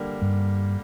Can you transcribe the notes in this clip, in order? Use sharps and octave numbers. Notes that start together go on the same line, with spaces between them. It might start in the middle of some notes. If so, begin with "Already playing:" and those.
Already playing: D3 G3 A#3
G2